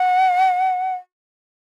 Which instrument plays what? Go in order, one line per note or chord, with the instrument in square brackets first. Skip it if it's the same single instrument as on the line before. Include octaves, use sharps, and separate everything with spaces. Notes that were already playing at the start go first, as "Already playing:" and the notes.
Already playing: [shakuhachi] F#5